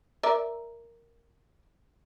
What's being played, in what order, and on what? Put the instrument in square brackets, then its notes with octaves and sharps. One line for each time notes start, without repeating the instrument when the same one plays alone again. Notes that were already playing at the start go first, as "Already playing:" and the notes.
[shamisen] A#4 D5 E5